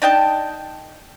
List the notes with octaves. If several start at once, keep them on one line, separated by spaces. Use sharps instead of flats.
D4 D#4 G5 A5